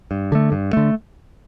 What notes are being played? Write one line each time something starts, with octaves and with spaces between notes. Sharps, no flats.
G2
D3 A3
G2
D3 A3